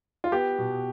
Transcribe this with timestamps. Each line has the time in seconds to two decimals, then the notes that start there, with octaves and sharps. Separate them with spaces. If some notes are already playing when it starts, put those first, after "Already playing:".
0.24 F4
0.32 B3 G4
0.58 B2